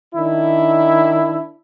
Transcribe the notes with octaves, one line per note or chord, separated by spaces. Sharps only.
D#3 D4 E4